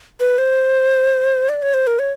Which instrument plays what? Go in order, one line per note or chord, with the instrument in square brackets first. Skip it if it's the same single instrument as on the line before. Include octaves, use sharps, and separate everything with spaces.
[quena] B4
C5
D5
C#5
C5
A#4
C#5